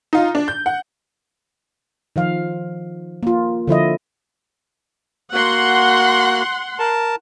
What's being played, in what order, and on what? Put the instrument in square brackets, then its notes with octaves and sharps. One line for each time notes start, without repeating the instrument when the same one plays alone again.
[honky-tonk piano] D#4 F4
D4
G6
F#5
[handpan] D#3 F3 F5
A#3 F4
D3 F3 E4 D#5
[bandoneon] A#3 F#4 [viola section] F#5 C6
[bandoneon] A#4 A5